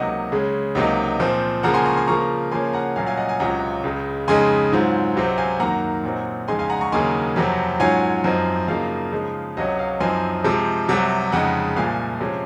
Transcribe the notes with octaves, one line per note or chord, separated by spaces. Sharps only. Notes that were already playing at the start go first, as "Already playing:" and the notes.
Already playing: C#2 C3 F#3 A#3 D#4 D#5 F#5
C#3 G#3 C#4
C#2 C3 F#3 A#3 D#4
A#2 F3 C4
C#3 F3 A#3 F#5 A#5
G#5 C6
A#5 C#6
G#5 C6
C#3 F3 A#3 F4 A#5 C#6
C#3 F3 A#3 C#4 G#5 C6
F#5 A#5
C2 A#2 F#3 C#4 F4 F5 G#5
F5 G#5
D#5 F#5
F5 G#5
C#2 C3 F#3 C#4 F4 F#5 A#5
C#2 C#3 G#3
F2 C#3 G#3 D#4 G#5 C6
G#2 F#3 C4 F4
C#2 C3 F#3 C4
F5 G#5
F#2 D#3 A#3 F#5 A#5
A#2 F#3 C4 D#4
F2 C#3 G#3 D#4 G#5 C6
F5 G#5
F#5 A#5
A#5 C#6
D#2 C#3 F#3 A#3 D#4 G#5 C6
F2 C3 F#3 C4
G#2 F#3 C#4 F4 F5 G#5
F#2 F3 C4 D#4
F#2 C#3 F3 A#3 D#4 F5
C#3 F3 G#3 D#4
C#2 C3 F#3 C#4 D#5
F5
F#2 F3 C4 D#4 G#5 C6
C3 F3 G#3
C2 C3 F#3
F2 C#3 G#3 D#4 F#5 A#5
C2 A#2 F3 F5 G#5
C3 F3 G#3 C#4